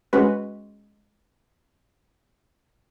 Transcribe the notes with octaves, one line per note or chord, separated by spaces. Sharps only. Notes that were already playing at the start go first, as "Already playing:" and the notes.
G#3 C#4 F#4 B4